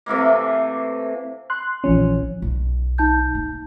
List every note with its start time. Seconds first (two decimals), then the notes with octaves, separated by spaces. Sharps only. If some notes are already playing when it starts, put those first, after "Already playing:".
0.06 C3 E3 A3 A#3
1.50 C6 F#6
1.84 A#1 E3 F3 C#4
2.42 B1
2.98 D#4 A5 G6
3.35 A#3